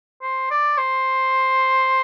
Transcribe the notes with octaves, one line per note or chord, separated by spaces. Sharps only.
C5
D5
C5